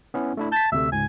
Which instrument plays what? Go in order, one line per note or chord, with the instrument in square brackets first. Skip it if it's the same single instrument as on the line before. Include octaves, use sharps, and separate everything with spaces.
[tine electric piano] B3 C#4 E4
A3 D4 E4
[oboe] A5 [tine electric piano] G6 B6
[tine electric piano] D2 C3 A3 [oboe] E5
[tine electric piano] C#2 G#2 [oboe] G#5